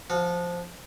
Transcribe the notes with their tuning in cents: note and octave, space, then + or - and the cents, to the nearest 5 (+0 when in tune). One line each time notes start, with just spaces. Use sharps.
F3 +0 F#4 -25